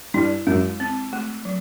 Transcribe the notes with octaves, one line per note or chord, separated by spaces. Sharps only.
G2 G3 E4
F#2 F#3 G#3
C4
A3
F#3